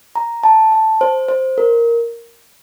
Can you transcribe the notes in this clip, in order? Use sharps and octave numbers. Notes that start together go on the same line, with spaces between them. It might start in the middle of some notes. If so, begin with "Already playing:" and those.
A#5
A5
A5
C5
C5
A#4